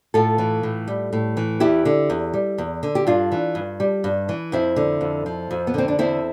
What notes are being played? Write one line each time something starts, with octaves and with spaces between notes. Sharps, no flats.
A2 F4 A4
E3
A2
G3
A2
E3
E2 E4 G4
D3
E2
G3
E2
D3
G4
G2 D4 F4
E3
G2
G3
G2
E3
F2 C4 E4
D3
F2
F3
F2
B3
D3 C4
D4
E2 C4 E4